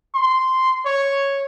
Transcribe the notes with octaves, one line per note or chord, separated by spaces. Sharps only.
C6
C#5